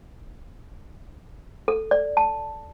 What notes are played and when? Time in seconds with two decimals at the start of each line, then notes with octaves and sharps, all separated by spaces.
1.68 A4
1.91 D5
2.17 A5